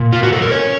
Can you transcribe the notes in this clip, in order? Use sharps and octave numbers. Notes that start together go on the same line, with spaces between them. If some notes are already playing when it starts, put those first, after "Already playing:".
Already playing: A#2
A#3 F4
F#4
F#3 A4
A#4
C#4 C#5